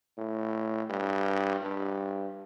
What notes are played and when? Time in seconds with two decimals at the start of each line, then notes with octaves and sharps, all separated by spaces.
0.18 A2
0.90 G2
1.62 G2